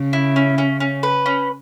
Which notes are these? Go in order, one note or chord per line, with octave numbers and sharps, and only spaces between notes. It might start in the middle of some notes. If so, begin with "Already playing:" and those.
Already playing: C#3
E4
C#4
C#4
C#4
B4
C#4